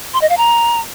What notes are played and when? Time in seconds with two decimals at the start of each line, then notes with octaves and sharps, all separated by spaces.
0.14 C6
0.22 D#5
0.30 F5
0.38 A#5